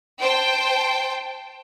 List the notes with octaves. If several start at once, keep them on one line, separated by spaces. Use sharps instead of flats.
C5 G5 A5